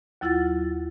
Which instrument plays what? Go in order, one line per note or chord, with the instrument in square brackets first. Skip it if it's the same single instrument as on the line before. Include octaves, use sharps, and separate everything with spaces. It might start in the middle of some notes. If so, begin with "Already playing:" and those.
[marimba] D#2 F#3 E4 F4 F#5 A6